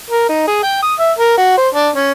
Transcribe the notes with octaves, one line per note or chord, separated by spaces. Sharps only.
A#4
D#4
G#4
G5
D#6
E5
A#4
F#4
C5
D4
C#4